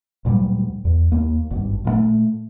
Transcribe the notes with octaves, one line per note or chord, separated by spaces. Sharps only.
D2 A#2 F#3 G3
E2
D#2 A#3
G#1 G2
A#2 D#3 A3